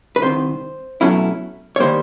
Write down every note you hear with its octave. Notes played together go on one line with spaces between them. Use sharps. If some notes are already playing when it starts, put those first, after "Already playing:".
B4
C2 C3 D#3 C5
B2 F#3 A3 C#4 E4
C#5
D#3 G3 A#3 C5